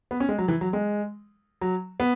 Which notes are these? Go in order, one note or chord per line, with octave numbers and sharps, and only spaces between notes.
B3
C#4
G#3
F#3
E3
F#3
G#3
F#3
B3